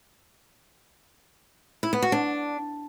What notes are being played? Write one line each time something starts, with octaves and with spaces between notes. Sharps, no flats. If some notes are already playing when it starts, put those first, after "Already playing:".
E4
B3
F#4
D4